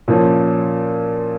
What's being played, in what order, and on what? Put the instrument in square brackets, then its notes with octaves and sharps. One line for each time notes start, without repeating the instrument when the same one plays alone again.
[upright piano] A#2 F3 C#4